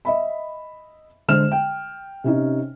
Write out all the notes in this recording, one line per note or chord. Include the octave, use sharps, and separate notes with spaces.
D#5 E5 B5
D3 G#3 C5 F6 E7
G5
C3 C#4 D#4